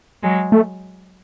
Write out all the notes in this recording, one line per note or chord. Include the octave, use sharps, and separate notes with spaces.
F#3 G#3
A3